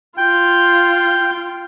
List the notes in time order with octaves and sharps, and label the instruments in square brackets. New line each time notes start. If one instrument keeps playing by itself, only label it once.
[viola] F4 [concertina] G5